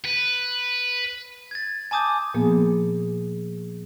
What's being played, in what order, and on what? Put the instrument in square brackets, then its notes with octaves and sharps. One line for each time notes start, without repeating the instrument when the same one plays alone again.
[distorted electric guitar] B4
[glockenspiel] G#6 A6
G#5 A5 D6 D#6 G6
[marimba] A#2 F3 A#3 B3 G#4